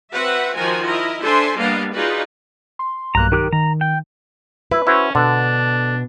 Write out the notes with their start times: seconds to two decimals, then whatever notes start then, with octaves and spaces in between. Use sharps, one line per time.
0.13 C4 F#4 B4 E5 F#5
0.56 D#3 F3 F4 F#4 A#4 G#5
0.86 E4 A#4 D#5
1.21 D4 A4 C5 E5 G#5 C6
1.58 G3 A#3 B3 D4 D#5 F5
1.94 D#4 F4 F#4 G#4 B4 D5
2.79 C6
3.15 B1 G2 A#3 A#5 F#6
3.32 D#3 G4 A#4 F#6
3.53 D#3 A#5
3.81 G5
4.71 E4 B4
4.87 C#4 E4 F#4 C5
5.15 B2 D3 D4